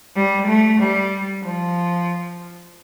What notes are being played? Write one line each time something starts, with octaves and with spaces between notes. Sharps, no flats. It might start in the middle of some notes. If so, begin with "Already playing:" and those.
G3
A3
G3
F3